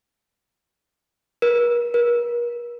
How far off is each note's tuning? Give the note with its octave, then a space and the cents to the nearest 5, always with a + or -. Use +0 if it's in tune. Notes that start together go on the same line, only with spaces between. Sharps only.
A#4 +45
A#4 +40